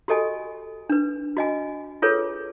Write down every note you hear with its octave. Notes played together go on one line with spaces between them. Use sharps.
F#4 G4 A4 D#5 G#5
D4 B4
F#4 D#5 G#5
F4 G#4 A4 B4 C#5